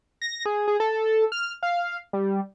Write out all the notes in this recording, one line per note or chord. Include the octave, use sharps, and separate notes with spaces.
A#6
G#4
G#4
A4
F6
F5
G3